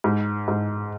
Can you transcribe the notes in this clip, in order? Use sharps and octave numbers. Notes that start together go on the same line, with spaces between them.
G#2
G#2